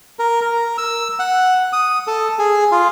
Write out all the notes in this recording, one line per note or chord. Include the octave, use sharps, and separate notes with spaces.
A#4
A#4
E6
F#5
D#6
A4
G#4
F4